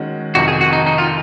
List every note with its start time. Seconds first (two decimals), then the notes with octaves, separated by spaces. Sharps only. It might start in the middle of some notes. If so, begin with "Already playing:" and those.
Already playing: D#3 G#3 C#4 F#4
0.35 F2 C3 D#3 F#4
0.48 G#4
0.61 F#4
0.73 D#4
0.86 D#4
0.98 F4